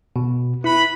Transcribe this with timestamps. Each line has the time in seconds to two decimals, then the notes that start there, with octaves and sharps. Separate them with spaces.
0.16 B2
0.64 E4 B4 B5